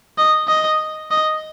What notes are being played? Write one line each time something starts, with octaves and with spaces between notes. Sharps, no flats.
D#5
D#5
D#5